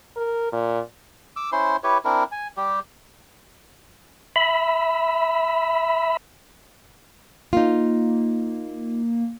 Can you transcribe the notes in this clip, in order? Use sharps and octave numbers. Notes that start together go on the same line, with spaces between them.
A#4
A#2
D6 E6
C#4 E4 C5 C6
E4 G4 B4 C#5
C4 D4 E4 A#4
G#5
G3 G4
E5 B5
A#3 D#4 F4